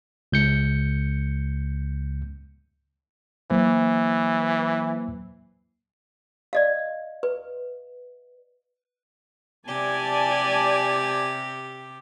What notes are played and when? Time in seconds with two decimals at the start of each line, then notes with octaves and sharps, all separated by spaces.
0.32 C#2 G6 C#7
3.51 E3 F#3 A#3 C5
6.53 D5 D#5 F5
7.23 B4
9.68 C3 G4 D5 G#5 A5